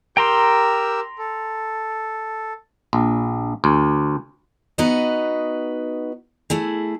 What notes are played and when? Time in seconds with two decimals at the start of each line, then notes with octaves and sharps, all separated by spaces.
0.17 G4 A#4 G5 A#5 C6 E6
1.18 A4
2.93 A#1
3.64 D2
4.78 B3 D#4 F#4 B4 D#5
6.50 A3 E4 G#4